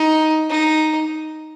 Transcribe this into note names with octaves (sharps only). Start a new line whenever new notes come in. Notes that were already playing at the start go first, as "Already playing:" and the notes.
Already playing: D#4
D#4